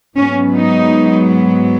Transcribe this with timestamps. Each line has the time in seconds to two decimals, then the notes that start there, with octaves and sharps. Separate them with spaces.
0.17 G#2 F#3 B3 C#4
0.55 D#4